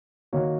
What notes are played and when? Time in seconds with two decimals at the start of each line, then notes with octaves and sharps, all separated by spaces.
0.33 D#3 A#3 F#4 C#5